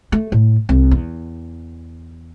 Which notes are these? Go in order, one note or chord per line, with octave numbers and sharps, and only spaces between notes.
A3
A2
C2
E2